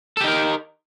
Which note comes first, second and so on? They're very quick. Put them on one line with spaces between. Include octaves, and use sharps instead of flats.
A4 G4 D#4 A#4